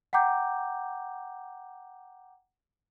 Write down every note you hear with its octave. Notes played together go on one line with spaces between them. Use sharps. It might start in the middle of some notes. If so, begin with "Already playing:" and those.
F#5 G5 A#5 D6 G6